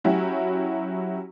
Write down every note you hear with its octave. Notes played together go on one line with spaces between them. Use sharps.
F#3 C#4 E4 F#4 G4